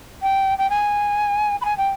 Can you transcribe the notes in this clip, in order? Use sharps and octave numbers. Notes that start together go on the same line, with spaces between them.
G5
G5
G#5
B5
G#5
G5